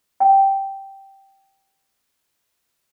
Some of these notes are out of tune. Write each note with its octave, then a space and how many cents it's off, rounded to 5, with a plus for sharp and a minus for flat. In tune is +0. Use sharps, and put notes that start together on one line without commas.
G5 -5